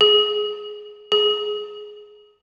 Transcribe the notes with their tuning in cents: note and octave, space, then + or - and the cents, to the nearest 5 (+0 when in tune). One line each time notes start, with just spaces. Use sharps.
G#4 +15
G#4 +15